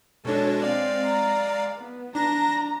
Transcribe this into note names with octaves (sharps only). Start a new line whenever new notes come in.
B2 G#3 D4 A4 C#5
G#3 C4 D5 F5
A#5
B3
D4 A#5 A#6